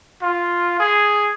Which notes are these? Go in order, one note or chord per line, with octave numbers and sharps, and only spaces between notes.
F4
G#4